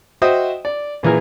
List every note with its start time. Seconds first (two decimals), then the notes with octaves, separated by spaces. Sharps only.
0.22 F#4 C5 D#5 E5 G5 D#6
0.65 D5
1.03 A#2 E3 G#4 A#4